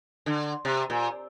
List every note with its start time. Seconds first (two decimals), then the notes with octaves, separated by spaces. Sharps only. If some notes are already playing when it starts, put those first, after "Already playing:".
0.26 D3
0.65 C3
0.90 A#2